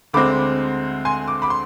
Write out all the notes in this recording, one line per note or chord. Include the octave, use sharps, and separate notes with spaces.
D2 D3 G#3 C4 B5 D6
G#5 C6
D6
B5 D6
C6